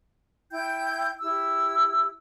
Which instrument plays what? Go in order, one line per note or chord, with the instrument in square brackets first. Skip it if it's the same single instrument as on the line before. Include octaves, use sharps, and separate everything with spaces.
[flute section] E4 G5 G6
E4 G4 E6